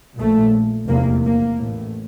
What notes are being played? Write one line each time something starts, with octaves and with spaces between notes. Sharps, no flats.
A#1 A#2 A3
F1 E2 C3 A#3
A#3
A1 A2